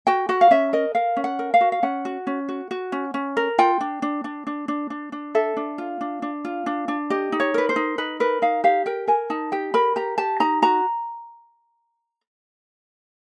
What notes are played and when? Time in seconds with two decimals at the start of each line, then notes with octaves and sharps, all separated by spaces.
0.07 F#4 G5
0.29 F#4 F#5
0.41 F5
0.51 C#4 E5
0.73 A#4 D#5
0.95 A#4 F5
1.17 C#4
1.24 F#5
1.39 A#4
1.54 F5
1.61 F#4
1.72 F5
1.83 C#4 F#5
2.05 F#4
2.27 C#4
2.49 F#4
2.71 F#4
2.92 C#4
3.14 C#4
3.37 A#4
3.58 F4 G5
3.81 D4
4.02 D4
4.24 D4
4.47 D4
4.68 D4
4.90 D4
5.12 D4
5.35 A4 E5
5.57 D4
5.78 F4
6.01 D4
6.22 D4
6.45 F4
6.66 D4
6.88 D4
7.10 G4 D#5
7.32 D#4
7.40 C#5
7.54 A#4 B4
7.69 C5
7.76 D#4
7.98 D#4 B4
8.20 A#4 B4
8.42 D#4 F5
8.64 G4 F5
8.86 A#4 G5
9.08 A#4 G#5
9.30 D#4 A5
9.52 G4 G5
9.74 A#4 B5
9.96 G4 A#5
10.18 G4 A5
10.40 D#4 A#5
10.62 F#4 A#5